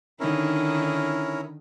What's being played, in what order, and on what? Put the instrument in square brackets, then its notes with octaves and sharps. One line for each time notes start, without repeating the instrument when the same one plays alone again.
[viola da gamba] D3 D#3 D#4 [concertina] C#4 E4 A#4